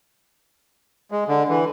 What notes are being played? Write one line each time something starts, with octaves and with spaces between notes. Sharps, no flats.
G#3
D3
E3